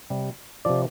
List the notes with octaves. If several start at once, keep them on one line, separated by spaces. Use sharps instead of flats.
C3 G3
C3 F3 D5